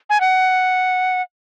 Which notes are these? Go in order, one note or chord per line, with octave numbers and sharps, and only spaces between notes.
G#5
F#5